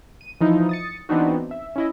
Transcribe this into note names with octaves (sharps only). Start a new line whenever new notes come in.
D#7
E3 F3 D#4 E4
D#6 A6 C#7
E3 B3 C4 D4 D#4 F#4
E5
C#4 E4 D#5